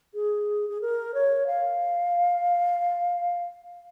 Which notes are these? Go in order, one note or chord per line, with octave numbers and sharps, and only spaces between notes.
G#4
G#4
A#4
C#5
F5